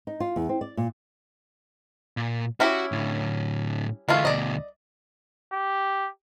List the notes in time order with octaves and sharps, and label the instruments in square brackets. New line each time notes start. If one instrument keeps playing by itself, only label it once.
[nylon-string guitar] D#4
F4
E2
C4
D5
A#2
[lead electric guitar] A#2
[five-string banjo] C#4 E4 G4 [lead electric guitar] F#4
[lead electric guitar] A2 D3
[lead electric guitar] D2 E3 [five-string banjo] G#3 A3 F4
[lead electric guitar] D2 B2 [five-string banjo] D5 D#5
[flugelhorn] G4